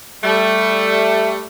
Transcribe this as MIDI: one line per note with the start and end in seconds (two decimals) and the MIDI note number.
0.24 1.46 55
0.24 1.46 57